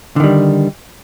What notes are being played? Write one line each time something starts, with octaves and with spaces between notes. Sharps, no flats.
D3 D#3 G3